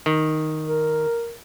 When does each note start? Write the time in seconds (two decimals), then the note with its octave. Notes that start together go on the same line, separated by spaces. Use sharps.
0.06 D#3
0.67 A#4